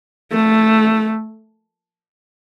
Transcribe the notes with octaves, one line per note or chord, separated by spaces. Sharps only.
A3